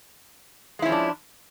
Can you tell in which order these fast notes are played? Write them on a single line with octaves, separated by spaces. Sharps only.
G#3 E4 C#4 F3 D4